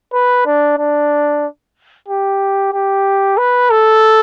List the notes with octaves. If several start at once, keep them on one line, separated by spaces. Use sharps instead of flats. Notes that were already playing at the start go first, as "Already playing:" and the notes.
B4
D4
D4
G4
G4
B4
A4